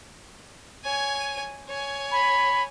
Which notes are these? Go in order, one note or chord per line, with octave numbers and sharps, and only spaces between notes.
C#5 G#5
C#5 G#5
B5